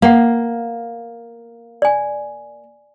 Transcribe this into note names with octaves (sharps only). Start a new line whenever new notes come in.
A#3 F5 F#5
D5 G#5